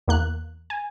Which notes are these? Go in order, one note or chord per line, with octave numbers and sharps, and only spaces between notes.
E2 A#3 F#6
G#5